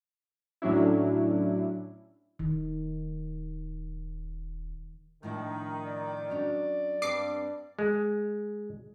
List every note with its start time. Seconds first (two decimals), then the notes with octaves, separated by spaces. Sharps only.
0.62 A2 F#3 C#4 D4 E4
2.39 D#1 D#3
5.23 A2 D#3 F3 D4
5.86 D5
6.30 F#3 C#4 D4
7.02 G2 C4 D6 C7
7.79 G#3